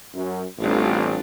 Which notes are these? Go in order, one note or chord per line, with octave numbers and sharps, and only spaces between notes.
F#2
A1 D2 D3 G3 C4 D4 F4